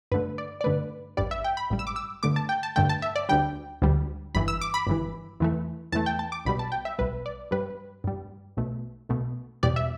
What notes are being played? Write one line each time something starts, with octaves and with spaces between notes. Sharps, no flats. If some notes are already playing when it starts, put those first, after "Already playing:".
G2 D3 A3 B4
D5
D5
G2 D3 A3 B4
A1 G2 G3 D5
E5
G5
B5
A1 G2 G3
E6
D6
E6
G2 D3 A3 D6
A5
G5
A5
G2 D3 A3 G5
A5
E5
D5
D2 D3 G3 G5
D2 D3 G3
G1 G2 E3 B5
E6
D6
B5
G1 G2 E3
E2 E3 A3
E2 E3 A3 A5
G5
A5
D6
B1 B2 G3 B5
A5
G5
E5
B1 B2 G3 B4
D5
G2 G3 B4
G2 G3
B1 B2 A3
B1 B2 A3
E2 B2 G3 D5
E5